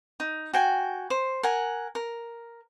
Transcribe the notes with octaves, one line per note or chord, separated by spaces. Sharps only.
D#4
F#4 G5 G#5
C5
A#4 F#5 G#5
A#4